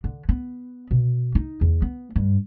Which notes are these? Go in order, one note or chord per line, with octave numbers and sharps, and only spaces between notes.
D3
B3
B2
D#4
E2
B3
G2